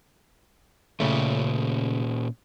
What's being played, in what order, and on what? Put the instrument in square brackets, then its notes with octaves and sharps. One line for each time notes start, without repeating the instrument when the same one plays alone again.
[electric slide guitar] A#2 C#4 [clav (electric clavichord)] C#3 A3